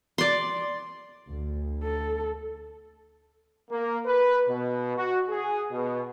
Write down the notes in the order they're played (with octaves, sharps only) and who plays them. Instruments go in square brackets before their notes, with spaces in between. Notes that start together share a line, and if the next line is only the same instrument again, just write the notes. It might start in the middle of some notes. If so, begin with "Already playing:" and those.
[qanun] D5 C6
[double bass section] D2
[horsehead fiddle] A4
[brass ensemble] A#3
B4
B2
F#4
G#4
B2